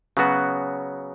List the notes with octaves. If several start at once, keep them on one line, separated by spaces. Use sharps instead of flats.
C#3 F#3 B3 F#4